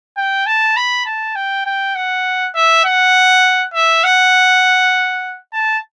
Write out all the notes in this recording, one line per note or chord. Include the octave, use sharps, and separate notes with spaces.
G5
A5
B5
A5
G5
G5
F#5
E5
F#5
E5
F#5
A5